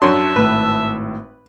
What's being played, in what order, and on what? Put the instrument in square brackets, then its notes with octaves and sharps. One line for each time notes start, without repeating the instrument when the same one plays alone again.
[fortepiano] F#2 C6 [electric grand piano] D4 F#4 C#5 [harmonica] E5 A5
[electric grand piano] G#1 E6 [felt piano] A2 [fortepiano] B4